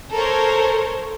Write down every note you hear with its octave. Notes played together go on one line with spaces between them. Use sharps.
A4 A#4 C5 C#5